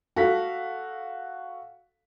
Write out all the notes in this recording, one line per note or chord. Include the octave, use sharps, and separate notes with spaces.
F#4 A4 F5 B6